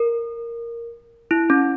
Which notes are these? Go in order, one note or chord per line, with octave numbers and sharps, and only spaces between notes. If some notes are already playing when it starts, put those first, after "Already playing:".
Already playing: A#4
E4
C#4